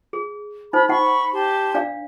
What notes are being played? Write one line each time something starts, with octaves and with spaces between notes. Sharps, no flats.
G#4
D#4 C5 B5
D#4 F#5 B5 C#6
G4 A5 C6
D4 D5 F5